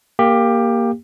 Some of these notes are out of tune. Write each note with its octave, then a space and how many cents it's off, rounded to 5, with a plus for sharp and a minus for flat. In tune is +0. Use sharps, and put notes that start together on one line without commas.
A#3 +0 G4 +15